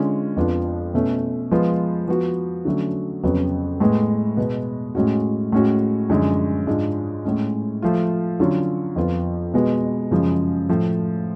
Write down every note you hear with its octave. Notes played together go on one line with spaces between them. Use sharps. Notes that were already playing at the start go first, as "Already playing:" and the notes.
Already playing: D3 G#3 C#4 F4
F2 F3 B3 D4 F4
B2 A3 C#4
F3 G#3 B3 F4
F3 B3 F#4
D3 F#3 A3 C#4 F#4
F2 C#3 F#3 B3
A2 G#3 B3
B2 G#3 B3
A2 G#3 C#4 F#4
A2 G#3 C#4 F#4
F#2 D3 F3 G#3
G#2 G#3 D4 F4
A2 G#3 C#4
F3 A3 F4
D3 F#3 C#4 F4
F2 F3 B3 F4
B2 G#3 B3 F#4
F#2 C#3 F3 G#3
A2 F3 A3